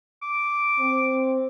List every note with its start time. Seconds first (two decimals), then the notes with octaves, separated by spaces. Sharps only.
0.23 D6
0.80 C4